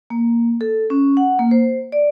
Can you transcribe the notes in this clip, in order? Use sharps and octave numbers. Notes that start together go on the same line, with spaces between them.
A#3
A4
C#4
F#5
A#3
C5
D5